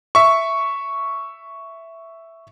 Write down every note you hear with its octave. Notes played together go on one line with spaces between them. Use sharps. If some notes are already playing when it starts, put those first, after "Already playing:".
E5 C#6